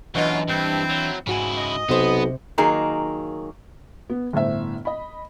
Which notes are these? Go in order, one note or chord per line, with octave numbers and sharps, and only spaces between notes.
F#2 B2 E3 F#3 D4 F4 D#5
G2 C4 E4
F#3
G#2 C#3 E4 F#4 G#5
D#5
B1 C3 B3 C5
D#3 F#3 A#3 D#4 G#4 A#4
B3
G1 A2 C5 E5
D#5 B5